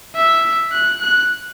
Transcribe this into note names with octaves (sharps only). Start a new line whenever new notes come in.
E5
F#6
F#6